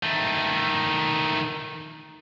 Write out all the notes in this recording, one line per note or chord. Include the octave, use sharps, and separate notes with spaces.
D#3 A3